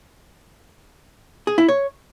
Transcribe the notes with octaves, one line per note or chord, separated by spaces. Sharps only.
G#4
E4
C#5